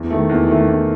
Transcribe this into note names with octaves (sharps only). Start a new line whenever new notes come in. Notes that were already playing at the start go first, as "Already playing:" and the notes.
Already playing: E2
D#3 A3
E2
D#3 A3
E2